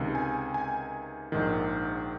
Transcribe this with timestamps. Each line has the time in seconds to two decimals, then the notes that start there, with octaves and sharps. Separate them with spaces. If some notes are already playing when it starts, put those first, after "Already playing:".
Already playing: C#2 C3 D#3
0.15 G#5
0.54 G#5
1.32 A#1 G#2 D#3